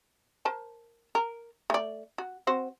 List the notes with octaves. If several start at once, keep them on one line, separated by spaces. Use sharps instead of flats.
A#4 C5 A5
A#4
A3 D5
F#4
C4 F#4 C5